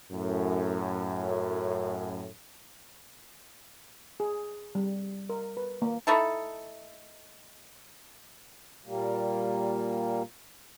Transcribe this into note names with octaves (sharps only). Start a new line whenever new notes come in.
F#2 A2
G#4
G3
A#4
B4
A#3
A3 D#4 E4 A4
A#2 G3 A#3